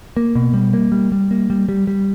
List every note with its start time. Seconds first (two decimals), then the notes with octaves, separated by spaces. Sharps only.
0.17 A#3
0.35 B2
0.54 G3
0.74 A#3
0.92 G3
1.12 G3
1.31 A#3
1.50 G3
1.69 G3
1.87 G3